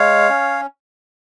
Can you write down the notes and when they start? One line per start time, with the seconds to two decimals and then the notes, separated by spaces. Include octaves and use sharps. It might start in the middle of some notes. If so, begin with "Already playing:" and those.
Already playing: G#3 C#5 F5
0.29 C#4